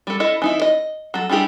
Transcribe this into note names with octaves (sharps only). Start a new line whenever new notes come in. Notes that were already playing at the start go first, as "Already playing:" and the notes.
G3 A4
E4 A4 D#5
E3 D#4 E4
D#5
F#3 A4
G3 D4 E4 G4 G#4